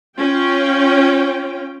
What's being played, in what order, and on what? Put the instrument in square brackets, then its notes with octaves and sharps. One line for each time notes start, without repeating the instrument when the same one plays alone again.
[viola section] C#4 F4 G5